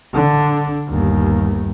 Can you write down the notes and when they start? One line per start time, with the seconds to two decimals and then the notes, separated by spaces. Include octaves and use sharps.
0.13 D3 D4
0.89 G1 D#2